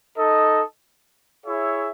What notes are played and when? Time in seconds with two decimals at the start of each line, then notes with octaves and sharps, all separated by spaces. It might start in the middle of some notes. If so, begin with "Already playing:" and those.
0.18 D#4 A4 D#5
1.45 E4 G#4 C#5 E5